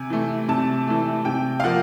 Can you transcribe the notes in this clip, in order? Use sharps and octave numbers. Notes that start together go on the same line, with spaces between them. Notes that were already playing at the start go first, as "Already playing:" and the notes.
Already playing: C3 G#5
E3 A3
C3 A5
E3 A3
C3 G5
F5
F3 A#3 F#5